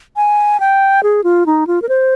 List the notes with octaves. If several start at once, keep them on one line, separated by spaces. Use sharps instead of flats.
G#5
G5
G#4
F4
D#4
F4
A#4
C5